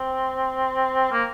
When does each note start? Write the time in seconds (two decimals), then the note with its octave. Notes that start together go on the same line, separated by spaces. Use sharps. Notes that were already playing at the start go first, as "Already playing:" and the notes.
Already playing: C4
1.11 A#3